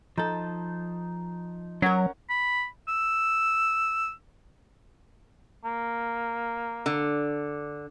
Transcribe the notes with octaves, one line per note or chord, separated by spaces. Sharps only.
F3 D#4 A4
F#3 C#4 A#4 C#5 F#5
B5
E6
A#3
D3